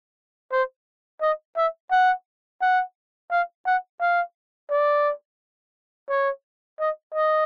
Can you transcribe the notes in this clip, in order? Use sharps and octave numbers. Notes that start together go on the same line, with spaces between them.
C5
D#5
E5
F#5
F#5
F5
F#5
F5
D5
C#5
D#5
D#5